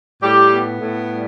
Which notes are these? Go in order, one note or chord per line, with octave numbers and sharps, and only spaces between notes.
A2 G3 G4
B3
A2
G3